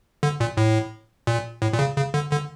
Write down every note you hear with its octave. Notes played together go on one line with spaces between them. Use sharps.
D3
A#2
A2
A#2
A2
A#2
C#3
C#3
D3
D3